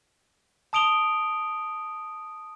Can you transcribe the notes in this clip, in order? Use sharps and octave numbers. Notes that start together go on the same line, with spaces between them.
A5 D#6 D7 F7 G7